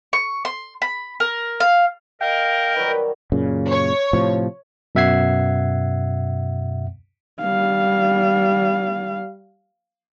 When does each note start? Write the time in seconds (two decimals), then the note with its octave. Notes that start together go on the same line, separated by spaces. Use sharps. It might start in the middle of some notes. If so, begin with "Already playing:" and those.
0.13 C#6
0.45 C6
0.82 B5
1.20 A#4
1.60 F5
2.21 A#4 D#5 F5 G5
2.76 D#3 F#3 G3 B4
3.32 F#2 A#2 C#3
3.69 C#5
4.13 A2 C3 F3
4.95 F#2 B2 E5 F#5 G#6 C7
7.41 G3 F5